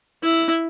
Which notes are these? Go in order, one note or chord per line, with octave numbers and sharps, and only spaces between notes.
E4